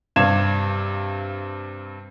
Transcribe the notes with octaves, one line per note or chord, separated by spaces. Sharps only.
G2 C3 F5 G#6 E7